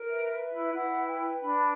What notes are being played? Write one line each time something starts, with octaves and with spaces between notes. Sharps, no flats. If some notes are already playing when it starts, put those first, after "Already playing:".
Already playing: A#4
B4 E5
B4
E4
E4 F#5
B4
G5
B4
D4 B5